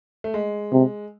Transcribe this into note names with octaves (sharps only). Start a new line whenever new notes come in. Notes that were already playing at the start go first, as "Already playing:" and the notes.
A3
G#3
C3